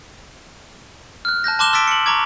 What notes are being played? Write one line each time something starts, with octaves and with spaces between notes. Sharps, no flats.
F6 F#6
A5 F#6 G6 A#6
A5 C6 D6 F#6 E7 G7
C6 E6 A6 B6 D7
C#7 F#7
A#5 C#6 D6 G#6